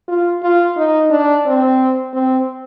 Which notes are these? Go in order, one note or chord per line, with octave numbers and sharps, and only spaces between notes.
F4
F4
D#4
D4
C4
C4